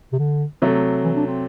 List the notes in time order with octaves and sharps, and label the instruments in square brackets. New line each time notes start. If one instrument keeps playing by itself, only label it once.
[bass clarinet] C3
D3
[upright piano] C3 F#3 A3
[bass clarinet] E3
D4
C4